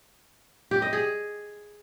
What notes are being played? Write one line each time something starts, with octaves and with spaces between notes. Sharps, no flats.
G4
D#5
G#4